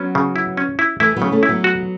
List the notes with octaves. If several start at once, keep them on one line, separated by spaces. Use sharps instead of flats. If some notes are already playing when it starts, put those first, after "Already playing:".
Already playing: F#3 B3 C#4
C#3
E4
C#4
E4
E3 A3 E4
F#3 B3
C#3
A3 C#4
E4
F#3 B3
F#4